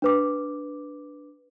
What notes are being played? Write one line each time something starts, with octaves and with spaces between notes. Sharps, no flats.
D4 B4 D6